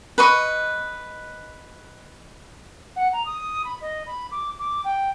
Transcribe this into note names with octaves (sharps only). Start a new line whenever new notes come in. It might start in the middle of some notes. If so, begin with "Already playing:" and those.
B4 D#5 C#6
F#5
A#5
D#6
B5
D#5
B5
D6
D6
G5